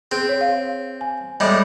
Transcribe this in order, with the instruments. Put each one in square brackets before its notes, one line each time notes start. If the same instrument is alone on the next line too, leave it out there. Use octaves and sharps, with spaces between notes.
[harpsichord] C4 [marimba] G#4
[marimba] C#5
F5
G#5
[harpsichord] A2 G3 G#3